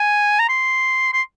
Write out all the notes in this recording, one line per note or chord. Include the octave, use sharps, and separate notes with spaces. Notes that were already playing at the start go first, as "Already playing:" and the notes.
Already playing: G#5
A#5
C6
C6